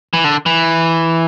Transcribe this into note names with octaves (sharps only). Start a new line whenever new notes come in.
E3
D3
E3